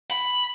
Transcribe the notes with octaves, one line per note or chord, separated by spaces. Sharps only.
B5